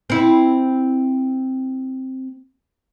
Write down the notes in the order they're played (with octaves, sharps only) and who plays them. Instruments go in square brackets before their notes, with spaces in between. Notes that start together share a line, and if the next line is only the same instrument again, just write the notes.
[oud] C4 E4